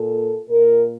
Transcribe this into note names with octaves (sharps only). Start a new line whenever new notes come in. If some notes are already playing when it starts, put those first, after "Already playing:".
Already playing: A#2 A4
A#2 A#4